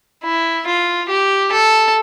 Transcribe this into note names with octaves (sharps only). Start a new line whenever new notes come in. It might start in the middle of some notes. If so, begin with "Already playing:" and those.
E4
F4
G4
A4